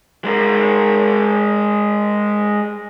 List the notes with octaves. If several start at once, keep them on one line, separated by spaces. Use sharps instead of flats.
G#3 A#4